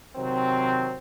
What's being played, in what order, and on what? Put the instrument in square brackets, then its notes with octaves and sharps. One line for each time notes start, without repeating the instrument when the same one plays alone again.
[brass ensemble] C3 D#3 F#3 C4